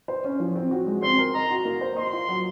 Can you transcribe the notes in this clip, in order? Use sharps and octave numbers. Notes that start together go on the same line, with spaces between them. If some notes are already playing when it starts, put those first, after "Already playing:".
C5
C#4
F3
C4
F#4
G#3
C4 C6
A#4
D#5 A#5
F#4
A#3
C5
D#5 C6
F4
F#3